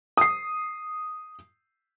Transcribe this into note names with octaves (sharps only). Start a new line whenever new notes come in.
D#6 C7